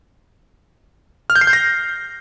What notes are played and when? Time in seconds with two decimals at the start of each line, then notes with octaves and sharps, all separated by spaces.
1.30 F6
1.35 G6
1.41 C7
1.47 G6
1.53 A#6